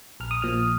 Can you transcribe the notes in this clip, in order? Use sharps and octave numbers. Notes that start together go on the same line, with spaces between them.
A#1 F6
D#6
A#2 F3 F6